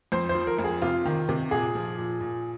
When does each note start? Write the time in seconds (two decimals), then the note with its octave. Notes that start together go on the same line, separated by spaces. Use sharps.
0.12 F2 C5
0.29 C5
0.35 F3
0.47 A#4
0.58 F2
0.64 G#4
0.82 C3 F4
1.05 D#3
1.29 C3
1.51 A#2 G#4
1.75 F3
1.98 A#2
2.21 A#2